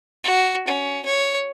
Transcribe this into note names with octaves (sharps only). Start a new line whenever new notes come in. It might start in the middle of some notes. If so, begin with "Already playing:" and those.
F#4
C#4
C#5